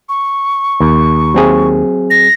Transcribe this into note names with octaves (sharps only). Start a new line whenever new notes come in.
C#6
D#2
F#3 C4 G#4
A#6